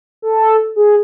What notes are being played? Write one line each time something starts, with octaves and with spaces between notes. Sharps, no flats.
A4
G#4